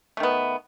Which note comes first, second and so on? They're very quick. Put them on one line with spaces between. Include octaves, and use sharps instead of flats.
A3 D#3 B3